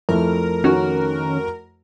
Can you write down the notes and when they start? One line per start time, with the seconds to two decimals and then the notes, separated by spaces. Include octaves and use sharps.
0.09 F2 A3 E4 A#4
0.64 D#3 C#4 F#4